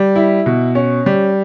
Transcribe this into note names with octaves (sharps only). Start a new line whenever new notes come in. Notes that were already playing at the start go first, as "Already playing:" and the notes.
Already playing: G3
E4
B2
C#4
G3